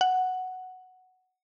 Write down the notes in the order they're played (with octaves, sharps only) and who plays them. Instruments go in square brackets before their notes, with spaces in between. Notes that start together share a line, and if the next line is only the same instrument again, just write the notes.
[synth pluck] F#5